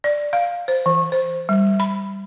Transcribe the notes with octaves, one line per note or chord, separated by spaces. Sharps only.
D5
F5
C5
E3
C5
G3
B5